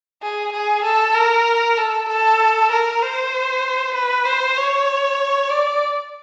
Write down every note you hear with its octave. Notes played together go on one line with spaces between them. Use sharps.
G#4
G#4
A4
A#4
A4
A4
A#4
C5
B4
C5
C#5
D5